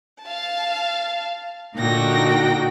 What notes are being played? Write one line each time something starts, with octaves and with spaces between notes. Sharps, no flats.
F5 A5
A#2 D3 D#4 F#4 G5 A#6